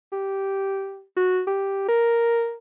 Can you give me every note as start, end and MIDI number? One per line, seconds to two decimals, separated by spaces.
0.13 1.02 67
1.17 1.42 66
1.47 1.86 67
1.89 2.54 70